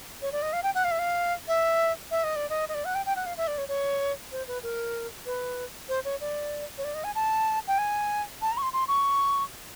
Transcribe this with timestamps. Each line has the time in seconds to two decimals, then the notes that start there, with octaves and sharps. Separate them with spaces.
0.22 C#5
0.32 D5
0.42 D#5
0.53 F5
0.63 G5
0.75 F#5
0.84 F5
0.91 E5
0.99 F5
1.48 E5
2.11 E5
2.24 D#5
2.36 D5
2.49 D#5
2.69 D#5
2.74 D5
2.85 F#5
2.95 G5
3.06 G5
3.16 F#5
3.26 F5
3.37 E5
3.47 D5
3.58 C#5
3.68 C#5
4.32 C5
4.47 B4
4.63 A#4
5.26 B4
5.89 C5
6.05 C#5
6.21 D5
6.78 C#5
6.84 D5
6.94 D#5
7.04 G#5
7.15 A5
7.67 G5
7.78 G#5
8.42 A5
8.51 A#5
8.58 C#6
8.62 C6
8.73 C6
8.88 C#6